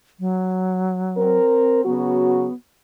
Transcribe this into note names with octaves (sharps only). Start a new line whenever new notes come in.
F#3
C4 A#4
C#3 F#3 B3 F#4